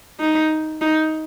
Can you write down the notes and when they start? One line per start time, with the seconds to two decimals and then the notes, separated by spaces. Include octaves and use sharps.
0.20 D#4
0.82 D#4